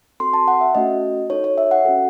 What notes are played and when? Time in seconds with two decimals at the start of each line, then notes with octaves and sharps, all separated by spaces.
0.20 C4 F#4 A4 C6
0.34 A5
0.48 F#5
0.61 E5
0.75 A3 C#4 F#4 A4 D#5
1.30 D#4 F#4 A4 C#5
1.44 C#5
1.58 E5
1.71 F#5
1.85 C#4 F#4 A4